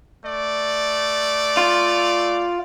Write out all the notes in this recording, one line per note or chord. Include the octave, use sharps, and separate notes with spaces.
A3 D5
F4